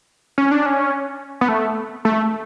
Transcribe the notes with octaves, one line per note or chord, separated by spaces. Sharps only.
C#4
D4
C#4
B3
A3
A3